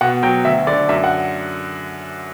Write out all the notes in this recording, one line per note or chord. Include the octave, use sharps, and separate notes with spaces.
B2 F#5
F#3 G5
D2 E5
D3 D5
F#2 E5
F#5